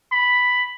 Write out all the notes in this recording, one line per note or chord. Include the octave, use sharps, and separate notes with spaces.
B5